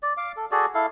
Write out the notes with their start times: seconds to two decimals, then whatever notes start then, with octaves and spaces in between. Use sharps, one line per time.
0.03 D5
0.17 F5 D6
0.37 A4
0.51 F#4 G#4 A4 D5
0.74 E4 A4 F5